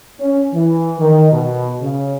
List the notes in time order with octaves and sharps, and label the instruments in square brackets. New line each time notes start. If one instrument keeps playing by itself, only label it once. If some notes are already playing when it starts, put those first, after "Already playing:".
[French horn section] C#4
E3
D#3
B2
C#3